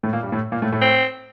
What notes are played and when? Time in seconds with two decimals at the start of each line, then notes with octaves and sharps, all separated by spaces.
0.03 A2 A3
0.13 A#2 A#3
0.23 G2 G3
0.32 A2 A3
0.52 A#2 A#3
0.62 A2 A3
0.72 A2 A3
0.81 C4